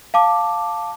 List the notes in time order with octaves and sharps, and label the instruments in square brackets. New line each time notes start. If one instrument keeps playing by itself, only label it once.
[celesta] F5 A5 D6